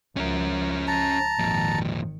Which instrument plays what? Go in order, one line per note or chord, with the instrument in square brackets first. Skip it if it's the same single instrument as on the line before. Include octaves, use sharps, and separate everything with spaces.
[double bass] C#2 F3 [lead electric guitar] C#4 A#4
[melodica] A5 A#5
[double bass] G#1 D#3 [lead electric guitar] F2 A#2